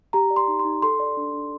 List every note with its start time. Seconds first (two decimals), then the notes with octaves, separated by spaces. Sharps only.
0.13 G4 A#5
0.30 D5
0.36 C6
0.48 D#4
0.59 C6
0.65 D#4
0.82 A4 C6
1.00 D5
1.17 D4
1.34 D4